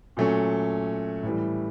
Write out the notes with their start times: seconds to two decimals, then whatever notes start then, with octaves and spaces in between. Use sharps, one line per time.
0.17 A#2 F#3 A3 C#4
1.23 A2 E3 G3